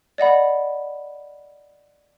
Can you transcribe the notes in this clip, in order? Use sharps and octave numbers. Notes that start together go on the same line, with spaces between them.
D5 D#5 F#5 B5